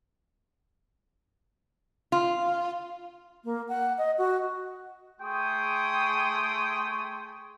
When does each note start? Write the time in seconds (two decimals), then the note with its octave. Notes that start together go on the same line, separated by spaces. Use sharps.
2.12 F4
3.45 A#3
3.69 F#5
3.98 D#5
4.18 F#4
5.21 A3 G#4 G5 C6 C#6 D#6